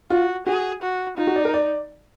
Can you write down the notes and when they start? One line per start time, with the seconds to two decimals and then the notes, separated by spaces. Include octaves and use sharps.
0.10 F4 F#4
0.47 F#4 G#4
0.82 F#4
1.18 D#4 F4
1.27 F#4
1.36 D5
1.45 A#4
1.54 D5